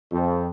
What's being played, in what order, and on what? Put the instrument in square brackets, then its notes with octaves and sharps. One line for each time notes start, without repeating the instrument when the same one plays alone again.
[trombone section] F2